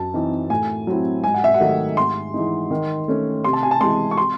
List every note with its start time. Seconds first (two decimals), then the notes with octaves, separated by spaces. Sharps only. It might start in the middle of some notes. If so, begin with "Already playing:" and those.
Already playing: F#2 A5
0.14 E3 C4 D#4
0.50 A2 G#5
0.87 F#3 C4 E4
1.24 G#2 G#5
1.34 F#5
1.44 E5
1.54 F#5
1.60 D#3 F#3 A3 D#4
1.97 G#2 C6
2.34 E3 G#3 D#4
2.71 D#3
3.08 A3 C#4
3.44 C3 C6
3.53 A5
3.63 G#5
3.71 A5
3.81 E3 G#3 C6
4.11 C#6
4.18 C6